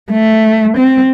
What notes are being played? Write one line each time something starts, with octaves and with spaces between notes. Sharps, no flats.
A3
C4